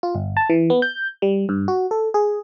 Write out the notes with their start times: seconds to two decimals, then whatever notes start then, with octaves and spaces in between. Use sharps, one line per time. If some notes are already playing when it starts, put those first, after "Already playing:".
0.03 F4
0.15 G1
0.37 A5
0.50 E3
0.70 B3
0.82 G6
1.22 G3
1.49 G2
1.68 F#4
1.91 A4
2.14 G#4